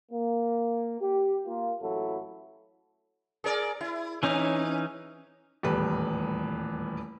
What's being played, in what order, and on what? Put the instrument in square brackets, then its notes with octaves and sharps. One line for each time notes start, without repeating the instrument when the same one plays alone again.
[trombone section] A#3
G4
A#3 F4
A1 F#3 E4 F#4 A4
[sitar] G#4 A#4 D5
E4
[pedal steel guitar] E3 C#4 D#4 [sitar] C4
[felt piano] D#1 E2 A2 G3 B4